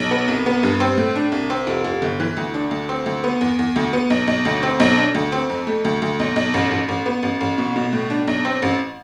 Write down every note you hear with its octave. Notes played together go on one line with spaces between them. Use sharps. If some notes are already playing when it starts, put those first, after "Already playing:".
Already playing: B1
B3
C2
B3
G2
C4
A2
D4
C2
C4
F1
F1
G1
E3
D2
D4
D2
C4
D2
B3
E2
E2
D2
B3
B1
B1
D2
C4
B1
D4
D2
C4
F2
A3
D2
D2
B1
B1
A1
A1
A1
B3
A1
A1
B2
B2
A2
D4
B1
C4
A1